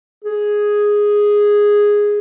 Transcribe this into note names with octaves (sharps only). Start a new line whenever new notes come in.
G#4